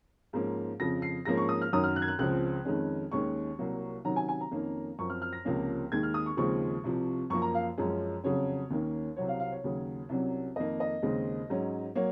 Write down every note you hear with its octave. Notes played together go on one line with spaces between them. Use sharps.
G#2 F3 A#3 C#4
F2 C#3 F3 A#6
C7
G#2 F3 A#3 C#4 A#6
C#6
D#6
F6
F#2 D#3 F#3 C#4 D#6
F6
F#6
G#6
F#6
C#2 C#3 F3 C4 F#6
F2 D#3 G#3 C#4
D#2 D#3 G#3 C#4 C#6
C2 C3 F#3 A#3
C3 D#3 F#3 C#4 A#5
G#5
G#5
A#5
F2 D#3 A#3 C#4
F#2 F3 C4 C#6
F6
F6
A#6
C#2 C3 F3 A#3 C#4
D#2 D#3 G#3 G#6
F6
D#6
C#6
D#2 C#3 F3 G#3 C4 C#6
C2 C3 F3
F#2 F3 A#3 C#6
A#5
F5
F#2 F3 G#3 C#4
F2 C#3 F#3 C#4 C#5
D#2 D#3 A#3 C#4
C2 C3 F#3 C4 C#5
F5
F5
C#5
D#2 C#3 F#3
C2 C3 F#3 C#4
F2 D#3 A#3 D#5
D#5
D#2 C#3 G#3 C4
G#2 F#3 C#4
F#3 A#3 C#5